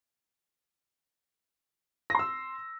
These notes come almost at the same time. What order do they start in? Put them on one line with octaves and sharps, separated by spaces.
A#6 C6 E6